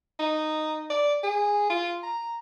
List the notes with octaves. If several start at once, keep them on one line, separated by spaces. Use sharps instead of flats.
D#4
D5
G#4
F4
A#5